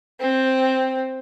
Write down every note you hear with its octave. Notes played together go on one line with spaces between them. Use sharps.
C4